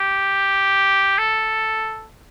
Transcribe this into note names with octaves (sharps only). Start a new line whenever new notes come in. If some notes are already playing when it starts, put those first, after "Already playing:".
Already playing: G4
A4